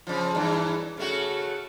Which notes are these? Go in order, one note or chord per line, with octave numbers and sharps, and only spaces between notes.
C#3 F3
E2 G2 E3
C#3 A3 F#4